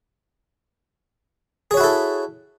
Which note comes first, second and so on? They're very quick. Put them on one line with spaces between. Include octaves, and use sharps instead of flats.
G#4 C#5 F#4 E4 A4